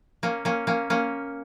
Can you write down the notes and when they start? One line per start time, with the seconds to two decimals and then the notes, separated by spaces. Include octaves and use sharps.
0.23 A#3 C#4
0.45 A#3 C#4
0.67 A#3 C#4
0.90 A#3 C#4